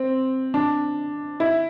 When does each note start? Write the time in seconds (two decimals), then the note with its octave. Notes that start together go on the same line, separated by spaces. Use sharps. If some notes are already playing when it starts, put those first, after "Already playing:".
Already playing: C4
0.54 D4
1.40 E4